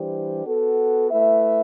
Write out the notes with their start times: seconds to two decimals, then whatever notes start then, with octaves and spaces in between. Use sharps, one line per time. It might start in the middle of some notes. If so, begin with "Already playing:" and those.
Already playing: E3 G3 D4 G4 C5
0.45 B3 F#4 A4
1.11 A3 E4 B4 E5